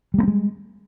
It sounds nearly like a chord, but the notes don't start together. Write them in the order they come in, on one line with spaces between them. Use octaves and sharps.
G3 A#3 C4 G#3